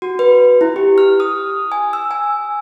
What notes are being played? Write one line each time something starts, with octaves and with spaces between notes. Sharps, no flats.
F#4
B4
E4
G4
F6
D#6
G#5
E6
G#5